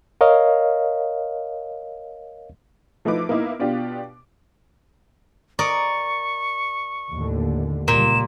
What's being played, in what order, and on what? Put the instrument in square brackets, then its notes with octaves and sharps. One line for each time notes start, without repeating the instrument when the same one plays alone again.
[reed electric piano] A#4 C#5 D#5 F5
[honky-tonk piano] F3 A3 D#4 E4 B4 D6
A#3 B3 D#4 E4
B2 D4 F4 G4
[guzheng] A#4 D5 D#5 [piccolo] C#6
[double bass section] D#2 A2 D3
[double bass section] C#2 G3 [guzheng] A#2 [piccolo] E7